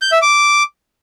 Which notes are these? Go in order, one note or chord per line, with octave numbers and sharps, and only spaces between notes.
G6
E5
D6